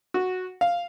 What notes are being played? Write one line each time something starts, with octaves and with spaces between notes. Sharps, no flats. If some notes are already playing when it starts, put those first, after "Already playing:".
F#4
F5